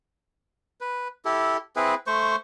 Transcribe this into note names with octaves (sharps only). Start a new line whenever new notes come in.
B4
E4 G4 A4
C4 E4 G#4 B4
A3 C5 C#6